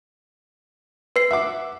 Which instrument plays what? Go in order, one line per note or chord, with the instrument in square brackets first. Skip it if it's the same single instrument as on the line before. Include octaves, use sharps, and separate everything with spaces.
[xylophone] B4 C7
[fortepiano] E5 F#5 D6